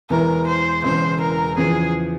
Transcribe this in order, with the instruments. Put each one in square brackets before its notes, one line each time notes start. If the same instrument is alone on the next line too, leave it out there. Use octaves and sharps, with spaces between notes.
[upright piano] E1 E2 E3 [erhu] A#4
[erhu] C5
[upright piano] E1 E2 C#3 [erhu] C5
[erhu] A#4
[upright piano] E2 C#3 F3 [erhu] G#4